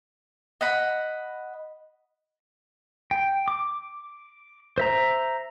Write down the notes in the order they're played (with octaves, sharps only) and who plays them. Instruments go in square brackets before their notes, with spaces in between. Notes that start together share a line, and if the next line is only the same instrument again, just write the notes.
[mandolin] D#5 F#5 B5
[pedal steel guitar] G5
D6
C5 E5 A#5